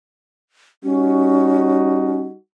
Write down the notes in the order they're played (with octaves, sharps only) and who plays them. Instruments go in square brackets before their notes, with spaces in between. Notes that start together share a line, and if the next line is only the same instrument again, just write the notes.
[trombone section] G3 D#4 F#4 [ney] C#4